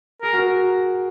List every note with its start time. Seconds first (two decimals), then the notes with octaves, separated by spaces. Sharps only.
0.22 G#4 A#4
0.33 F#4
0.38 A#4